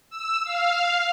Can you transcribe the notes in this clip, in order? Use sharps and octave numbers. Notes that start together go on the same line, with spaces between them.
E6
F5